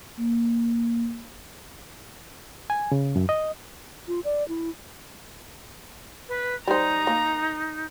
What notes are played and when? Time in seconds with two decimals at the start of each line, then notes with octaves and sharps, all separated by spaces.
0.18 A#3
2.70 G#5
2.92 C#3
3.16 F#2
3.29 D#5
4.08 F4
4.24 D5
4.48 E4
6.28 B4
6.67 G3 D#4 C5 A#5
7.07 A#3